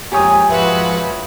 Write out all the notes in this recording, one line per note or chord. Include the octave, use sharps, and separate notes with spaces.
F2 G#3 A#3 G4 C#5 G#5 D#6
F2 G#2 F3 F#4 B4 E5